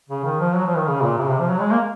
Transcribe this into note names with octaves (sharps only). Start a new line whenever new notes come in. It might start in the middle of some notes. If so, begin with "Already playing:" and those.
C#3
D#3
F3
F#3
F3
D#3
C#3
A#2
C3
C#3
C3
F3
F#3
G#3
A#3